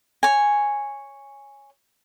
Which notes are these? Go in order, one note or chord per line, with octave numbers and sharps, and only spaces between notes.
C#5 G#5